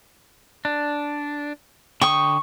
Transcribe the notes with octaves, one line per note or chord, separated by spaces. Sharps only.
D4
D3 G5 C#6 D#6